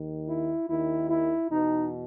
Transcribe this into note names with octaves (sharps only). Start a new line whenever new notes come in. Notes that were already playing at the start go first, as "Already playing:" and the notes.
Already playing: D#2 D#3
E4
D#2 D#3 E4
E4
E2 B2 D#4